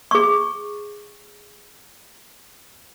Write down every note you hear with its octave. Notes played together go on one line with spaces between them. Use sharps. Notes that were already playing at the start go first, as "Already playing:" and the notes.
G#4 C#6